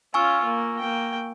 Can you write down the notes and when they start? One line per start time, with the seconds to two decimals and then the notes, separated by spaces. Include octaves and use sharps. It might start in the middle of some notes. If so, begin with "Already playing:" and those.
0.14 C#4 F4 G#5 C#6 E6
0.45 A#3
0.79 A#3 G5